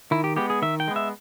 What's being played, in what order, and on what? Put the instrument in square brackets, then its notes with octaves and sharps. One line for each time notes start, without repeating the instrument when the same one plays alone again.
[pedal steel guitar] D#3 E4
G4
G#3 B3 G4
G#4
D#3 E5
G5
G#3 B3
E5